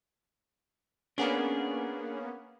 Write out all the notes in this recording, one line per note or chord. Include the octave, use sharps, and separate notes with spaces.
A#3 B3 C#4 D4 G#4